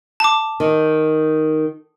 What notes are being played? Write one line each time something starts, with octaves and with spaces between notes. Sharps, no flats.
A5 D6
D#3